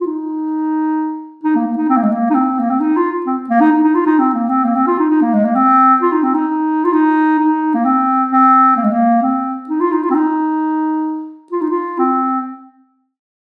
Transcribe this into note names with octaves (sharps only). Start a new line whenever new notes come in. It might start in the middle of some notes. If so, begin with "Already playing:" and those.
F4
D#4
D#4
A#3
A#3
D#4
C4
A#3
G#3
A#3
D#4
C4
A#3
C4
D#4
F4
C4
A#3
D#4
D#4
D#4
F4
D#4
C4
A#3
C4
A#3
C4
F4
D#4
D#4
A#3
G#3
A#3
C4
F4
D#4
C4
D#4
F4
D#4
D#4
A#3
C4
C4
A#3
G#3
A#3
C4
D#4
F4
D#4
F4
C4
D#4
F4
D#4
F4
C4